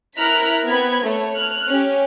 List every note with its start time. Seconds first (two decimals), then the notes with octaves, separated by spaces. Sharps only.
0.19 E4 A#4 A#5 F6 F#6 B6
0.67 B3 C4 B5 G#6
1.04 A3 C#5
1.38 F6 F#6
1.71 C#4 G4